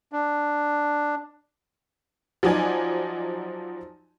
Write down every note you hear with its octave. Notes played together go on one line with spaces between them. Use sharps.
D4
F3 F#3 D#4 D5 G#5